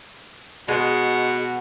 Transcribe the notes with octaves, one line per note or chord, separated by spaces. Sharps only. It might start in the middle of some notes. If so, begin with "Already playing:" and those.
B2 G#3 F#4